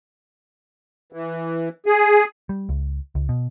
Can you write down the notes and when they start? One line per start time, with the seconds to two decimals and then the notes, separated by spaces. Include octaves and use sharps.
1.13 E3
1.86 G#4
2.49 G3
2.69 C#2
3.15 C#2
3.29 B2